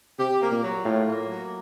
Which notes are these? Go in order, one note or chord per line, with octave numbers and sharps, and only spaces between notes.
C3 G4
A#3
A#2
F#3
A2 F4
A#3
F#3